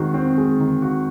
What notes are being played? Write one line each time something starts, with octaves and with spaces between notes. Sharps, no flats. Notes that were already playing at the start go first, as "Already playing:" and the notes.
Already playing: D#3 G#3 C4 F#4
C4
G#3
D#3
F#4